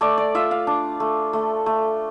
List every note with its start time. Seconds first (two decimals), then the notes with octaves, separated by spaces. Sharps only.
0.01 A3 D5
0.18 D5
0.35 F4 E5
0.51 F5
0.67 D4
1.00 A3
1.33 A3
1.66 A3